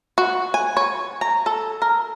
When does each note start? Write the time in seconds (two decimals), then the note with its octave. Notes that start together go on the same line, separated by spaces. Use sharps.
0.18 F#4
0.54 G#5
0.77 C#5
1.21 A#5
1.46 A4
1.82 A#4